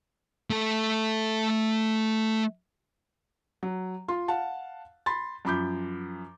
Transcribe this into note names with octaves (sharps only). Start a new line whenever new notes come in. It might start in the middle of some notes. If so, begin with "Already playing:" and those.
A3 A4
F#3
F4 C6
F5 F#5 A5
B5 C6 A6
F#2 F3 B5 D6 G6